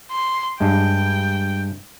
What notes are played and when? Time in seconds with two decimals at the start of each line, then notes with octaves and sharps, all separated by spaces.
0.12 C6
0.60 G2 G#3 G5